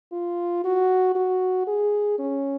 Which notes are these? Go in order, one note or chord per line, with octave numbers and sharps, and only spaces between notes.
F4
F#4
F#4
G#4
C#4